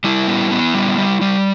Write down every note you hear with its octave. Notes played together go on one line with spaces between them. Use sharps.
G3 E4
B3
B3
G3
G3
G3